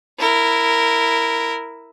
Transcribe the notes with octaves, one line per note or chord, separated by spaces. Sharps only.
E4 A#4